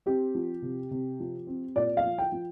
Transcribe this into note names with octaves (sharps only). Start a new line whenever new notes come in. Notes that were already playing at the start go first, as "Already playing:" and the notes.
C4 G4
F3
C3
C3
F3
C4
A#2 D5
F5
F3
G5
F3